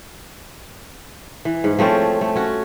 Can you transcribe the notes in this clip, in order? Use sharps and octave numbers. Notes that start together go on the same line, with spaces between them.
E3
G#2
F3 A3 C4 C#4
A3
C#4 F#4